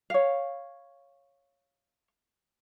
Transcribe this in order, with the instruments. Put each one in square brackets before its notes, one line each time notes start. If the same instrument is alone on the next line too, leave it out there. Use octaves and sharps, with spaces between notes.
[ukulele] C#5 F5